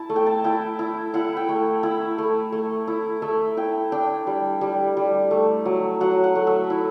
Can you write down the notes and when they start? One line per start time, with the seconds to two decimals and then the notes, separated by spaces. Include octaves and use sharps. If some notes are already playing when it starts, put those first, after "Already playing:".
Already playing: E4 A5
0.09 A3
0.16 G5
0.26 A5
0.44 E4 G5
0.79 E4
1.14 E4 F#5
1.37 G5
1.49 A3
1.83 E4 B5
2.18 A3
2.52 A3
2.87 E4
3.22 A3 E5
3.57 E4 G5
3.92 D4 G5
4.27 G3
4.61 G3
4.97 G3
5.31 A3
5.65 F#3
6.01 F#3 F#5
6.24 F#5
6.35 A3
6.47 E5
6.70 E4